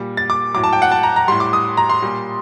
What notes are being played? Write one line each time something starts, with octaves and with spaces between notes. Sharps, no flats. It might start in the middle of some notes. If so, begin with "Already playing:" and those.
Already playing: A#2 G3
A6
D6
A2 F#3 D6
A5
G5
F#5
A5
A#5
A#5
A2 G3 C6
D6
D#6
A#5
C6
A#2 G3